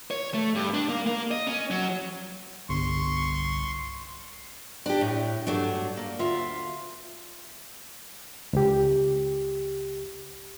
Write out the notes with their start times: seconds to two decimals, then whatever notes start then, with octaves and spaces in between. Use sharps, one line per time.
0.11 C#5
0.34 A3
0.55 G2
0.74 D4
0.89 A#3
1.07 A#3
1.31 D#5
1.47 C#4
1.71 F#3
2.69 G1 C2 C6 C#6
4.86 D4 G4
5.01 A2
5.47 G2 F#3 A3 D4
5.97 A#3
6.19 D2 F4 E5
8.53 C#2 G4